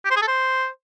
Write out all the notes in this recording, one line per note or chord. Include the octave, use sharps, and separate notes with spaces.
G4
C5
G#4
A4
C5